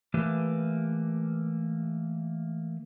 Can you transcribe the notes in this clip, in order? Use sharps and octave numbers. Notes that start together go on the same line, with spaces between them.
E3 A3 A#3 G4 B4